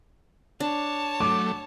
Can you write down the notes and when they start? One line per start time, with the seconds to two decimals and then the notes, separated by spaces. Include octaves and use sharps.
0.60 D4 C#5 A5
1.20 F#3 A3 D6